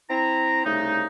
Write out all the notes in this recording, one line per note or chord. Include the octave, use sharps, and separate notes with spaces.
C4 E4 A#5
C2 C#3 A3 D#4